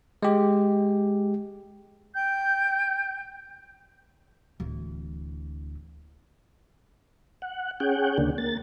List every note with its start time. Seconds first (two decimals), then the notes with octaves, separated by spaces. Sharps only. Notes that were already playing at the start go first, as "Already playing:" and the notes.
0.23 G#3 G4
2.16 G5 G6
4.60 D1 E3
7.42 F#5
7.80 C#4 G#4 F#5 G5
8.18 D2 C#3 A#3 D4
8.38 A#3 A6